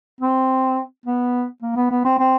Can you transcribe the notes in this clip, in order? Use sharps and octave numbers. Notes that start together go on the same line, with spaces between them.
C4
B3
A#3
B3
B3
C4
C4